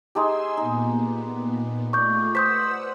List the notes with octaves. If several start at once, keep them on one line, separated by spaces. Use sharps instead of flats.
G#3 D#4 G4 G#5 C6 E6
A#2 B3 D#4
A3 F4 D5 C#6 G6
B4 C5 F#5 D#6 E6 G6 B6